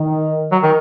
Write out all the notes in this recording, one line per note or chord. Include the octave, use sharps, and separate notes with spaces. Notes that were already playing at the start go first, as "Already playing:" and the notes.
Already playing: D#3
F#3
D#3